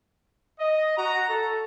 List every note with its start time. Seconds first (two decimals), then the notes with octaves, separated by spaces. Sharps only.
0.60 D#5
0.97 F#4 A#5
1.28 A4